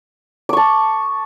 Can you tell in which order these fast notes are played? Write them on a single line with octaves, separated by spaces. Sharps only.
D6 C#6 A5